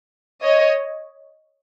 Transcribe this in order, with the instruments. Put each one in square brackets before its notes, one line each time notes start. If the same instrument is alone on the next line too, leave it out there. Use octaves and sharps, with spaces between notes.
[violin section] C#5 D#5